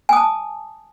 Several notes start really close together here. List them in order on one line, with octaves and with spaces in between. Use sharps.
G#5 D#6 A5